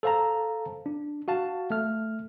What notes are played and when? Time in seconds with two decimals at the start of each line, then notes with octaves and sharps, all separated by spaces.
0.03 A4 C5 F5 A5 A#5
0.86 D4
1.28 F#4 F5 A5
1.70 A3 F6